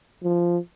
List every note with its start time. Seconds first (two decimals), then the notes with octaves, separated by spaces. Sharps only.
0.23 F3